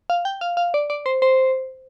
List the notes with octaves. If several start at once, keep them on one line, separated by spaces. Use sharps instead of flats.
F5
G5
F5
F5
D5
D5
C5
C5